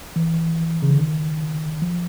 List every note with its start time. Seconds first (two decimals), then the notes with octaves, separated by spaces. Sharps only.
0.16 E3
0.82 C#3
0.91 D3
0.99 D#3
1.82 F3